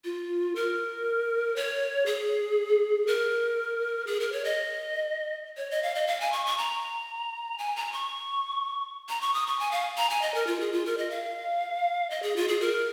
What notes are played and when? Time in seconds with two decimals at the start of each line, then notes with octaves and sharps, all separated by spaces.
0.05 F4
0.55 A#4
1.56 C#5
2.06 G#4
3.07 A#4
4.07 G#4
4.20 A#4
4.32 C#5
4.44 D#5
5.57 C#5
5.71 D#5
5.83 F5
5.95 D#5
6.07 F5
6.21 G#5
6.32 C#6
6.46 C#6
6.58 A#5
7.58 G#5
7.76 A#5
7.93 C#6
9.09 A#5
9.21 C#6
9.34 D#6
9.47 C#6
9.59 G#5
9.71 F5
9.97 A#5
10.10 G#5
10.22 D#5
10.34 A#4
10.47 F4
10.60 G#4
10.72 F4
10.86 A#4
10.98 D#5
11.10 F5
12.10 D#5
12.23 G#4
12.36 F4
12.48 G#4
12.61 A#4